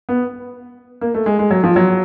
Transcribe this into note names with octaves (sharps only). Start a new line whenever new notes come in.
B3
A#3
A3
G#3
G#3
F#3
F3
F#3